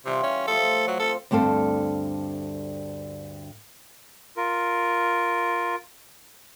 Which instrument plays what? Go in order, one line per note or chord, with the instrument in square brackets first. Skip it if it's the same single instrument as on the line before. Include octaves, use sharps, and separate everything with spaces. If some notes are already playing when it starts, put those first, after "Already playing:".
[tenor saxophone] C3 [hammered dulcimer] E3 G3 F4
[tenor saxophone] C#4
[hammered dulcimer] A2 F3 F5 [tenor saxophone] A4
[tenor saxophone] F#3
[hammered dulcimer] C4 F5 G5 [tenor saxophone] A4
[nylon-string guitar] D2 G2 C4 A4 F5
[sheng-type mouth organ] F4 A#4